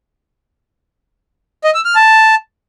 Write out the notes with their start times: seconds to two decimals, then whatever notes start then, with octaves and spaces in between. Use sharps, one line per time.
1.64 D#5
1.74 E6
1.85 F6
1.95 A5